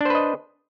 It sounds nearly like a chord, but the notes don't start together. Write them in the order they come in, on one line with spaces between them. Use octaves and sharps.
D4 C5 B4 D#5